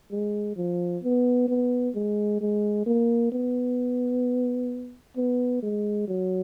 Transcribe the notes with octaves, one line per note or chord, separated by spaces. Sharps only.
G#3
F3
B3
B3
G#3
G#3
A#3
B3
B3
G#3
F#3